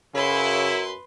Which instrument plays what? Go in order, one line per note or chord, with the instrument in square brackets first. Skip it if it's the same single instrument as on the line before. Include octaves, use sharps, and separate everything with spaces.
[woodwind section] F#2 [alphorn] C#3 [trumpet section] E4 [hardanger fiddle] B4 C6